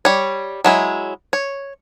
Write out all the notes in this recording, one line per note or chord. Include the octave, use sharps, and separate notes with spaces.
G3 C#5
F#3 G#3 E4
C#5